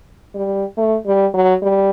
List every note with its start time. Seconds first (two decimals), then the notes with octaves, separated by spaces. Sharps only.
0.35 G3
0.77 A3
1.06 G3
1.34 F#3
1.62 G3